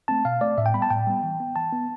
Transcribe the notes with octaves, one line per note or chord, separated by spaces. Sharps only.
A3 C4 A5
B2 F5
A3 C4 D5
A2 E5
G5
G3 B3 B5
A5
A2 G5
G3 B3
E3
B3
E3 A5
B3